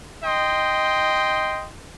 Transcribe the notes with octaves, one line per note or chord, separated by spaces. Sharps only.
D#4 D#5 G5 C6